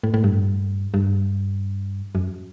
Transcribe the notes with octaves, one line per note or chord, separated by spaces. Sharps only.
A2
A2
G2
G2
F#2